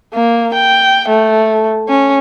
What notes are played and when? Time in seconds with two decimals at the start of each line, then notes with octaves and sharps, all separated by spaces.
0.14 A#3
0.54 G5
1.09 A3
1.88 C#4